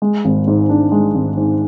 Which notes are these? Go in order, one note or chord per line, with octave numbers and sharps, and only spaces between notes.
G#3
G#1
G#2
D4
G#3
G#1
G#2